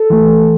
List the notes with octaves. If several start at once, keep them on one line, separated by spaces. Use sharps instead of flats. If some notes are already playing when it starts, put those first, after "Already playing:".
Already playing: A4
E3 A3